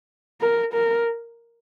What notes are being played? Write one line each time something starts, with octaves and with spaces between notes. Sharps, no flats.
A#4
A#4